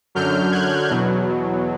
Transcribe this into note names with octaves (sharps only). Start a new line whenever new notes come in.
F#2 D3 F#3 F6 G6
F#6 G#6
E2 B2 F#3